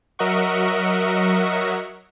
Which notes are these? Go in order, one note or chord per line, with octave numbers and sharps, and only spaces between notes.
F#3 A#4 D#5 E5 F#5 C#6